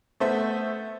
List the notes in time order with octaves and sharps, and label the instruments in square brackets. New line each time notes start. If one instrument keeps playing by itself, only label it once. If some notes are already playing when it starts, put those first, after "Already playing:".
[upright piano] A3 B3 C5 E5